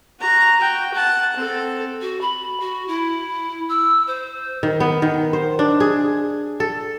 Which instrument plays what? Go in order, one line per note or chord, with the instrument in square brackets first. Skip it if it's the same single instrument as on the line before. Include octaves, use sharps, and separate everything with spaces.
[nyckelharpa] F#4 A#5
F#4 G5
F#5 A5
C4 A4
[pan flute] F#4
B5
F#4
E4
E6
C5
[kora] D#3
B3
D#3
C5
D4
G#4
A4